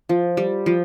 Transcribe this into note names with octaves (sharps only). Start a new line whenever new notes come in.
F3
G3
F3